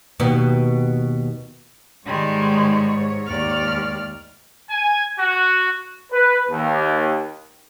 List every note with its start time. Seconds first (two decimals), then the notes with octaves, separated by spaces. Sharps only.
0.20 D#2 B2
2.06 G#2 D#3 G3 G#3 C#5
3.26 D#2 D5 F6
4.69 G#5
5.18 F#4
6.11 B4
6.49 D#2